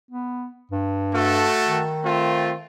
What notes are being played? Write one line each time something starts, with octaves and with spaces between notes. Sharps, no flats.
B3
G2
A3 F#4 A4
D#3
A3 C4 F4